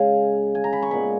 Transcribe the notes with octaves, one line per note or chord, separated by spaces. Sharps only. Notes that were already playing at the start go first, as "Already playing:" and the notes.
Already playing: C#3 G#3 C#4 F5 G#5
G#5
A#5
B5
C#6
A#2 G#3 B3 B5